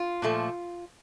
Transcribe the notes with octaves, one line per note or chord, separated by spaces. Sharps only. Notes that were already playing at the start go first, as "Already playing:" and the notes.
Already playing: F4
A#2 F3 A3